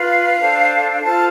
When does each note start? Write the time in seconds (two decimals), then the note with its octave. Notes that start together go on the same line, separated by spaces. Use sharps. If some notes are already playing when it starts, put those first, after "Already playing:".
Already playing: F4 B4 F5
0.38 D4 A4 C5
1.02 F4 A4 C5 A5